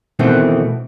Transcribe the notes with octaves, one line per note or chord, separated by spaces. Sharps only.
B2 D#3 E3 A3 B3 C4